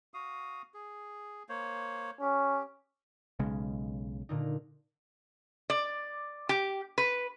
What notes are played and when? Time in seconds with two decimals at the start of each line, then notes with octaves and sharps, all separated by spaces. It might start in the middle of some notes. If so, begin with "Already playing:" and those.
0.14 F#4 F5 D#6
0.74 G#4
1.49 A#3 C5 C#5
2.21 C#4 G4
3.39 B1 C#3 G#3
4.29 A#2 D3 D#4
5.70 D5
6.49 G4
6.98 B4